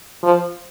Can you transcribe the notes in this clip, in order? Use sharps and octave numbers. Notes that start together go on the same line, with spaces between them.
F3